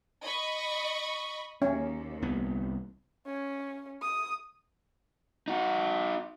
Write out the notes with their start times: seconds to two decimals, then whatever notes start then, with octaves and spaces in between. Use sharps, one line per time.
0.23 D#5 B5 C#6
1.62 D#2 C#4
2.22 C2 B3
3.26 C#4
4.02 D#6
5.48 D#4 F#4